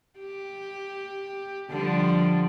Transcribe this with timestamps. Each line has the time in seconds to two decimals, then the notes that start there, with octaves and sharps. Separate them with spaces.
0.19 G4
1.69 D3 F3 G3